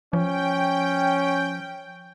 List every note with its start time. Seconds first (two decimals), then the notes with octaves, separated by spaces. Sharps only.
0.13 F3 C#4 G5